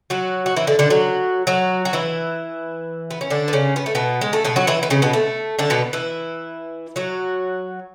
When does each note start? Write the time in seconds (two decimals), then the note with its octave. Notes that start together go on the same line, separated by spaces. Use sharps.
0.10 F#3 F#4
0.46 F#4
0.56 E3 E4
0.67 D3 D4
0.79 D3 D4
0.90 F#3 F#4
1.47 F#3 F#4
1.85 F#4
1.93 E3 E4
3.11 B3
3.21 C#4
3.30 D3 D4
3.48 B3
3.53 C#3 C#4
3.76 B3
3.86 A3
3.95 B2 B3
4.21 G#3
4.33 A3
4.44 B2 B3
4.56 F#3 F#4
4.67 E3 E4
4.83 B3
4.90 C#3 C#4
5.02 B2 B3
5.13 A3
5.59 D3 D4
5.70 B2 B3
5.93 E3 E4
6.96 F#3 F#4